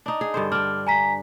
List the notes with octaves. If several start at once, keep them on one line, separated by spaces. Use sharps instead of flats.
D4 D#4
G#4
G2 D3 C5
D4 G5 F6
G#5 A#5 B6